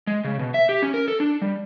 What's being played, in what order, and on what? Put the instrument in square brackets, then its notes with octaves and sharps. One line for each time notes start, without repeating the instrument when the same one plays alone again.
[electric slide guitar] G#3
C#3
B2
E5
G4
C#4
A#4
A4
D4
G3